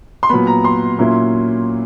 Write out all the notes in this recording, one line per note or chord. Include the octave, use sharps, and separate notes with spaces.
C6
A#2 F#3 B3 B5
A#5
C6
A#2 F#3 A#3 C#4 E4